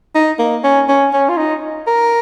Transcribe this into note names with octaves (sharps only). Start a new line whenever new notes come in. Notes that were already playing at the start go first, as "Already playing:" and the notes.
D#4
A#3
C#4
C#4
C#4
F4
D#4
A#4